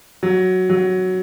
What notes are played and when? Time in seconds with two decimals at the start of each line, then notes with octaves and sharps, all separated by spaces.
0.23 F#3
0.69 F#3